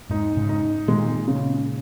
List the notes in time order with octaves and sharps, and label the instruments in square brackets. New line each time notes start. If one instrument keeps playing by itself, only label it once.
[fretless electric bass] G#2 [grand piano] D#4
[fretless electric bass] G#2 C#3
[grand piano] D#4
[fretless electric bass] A#2 D#3 [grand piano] G#3
[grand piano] C#3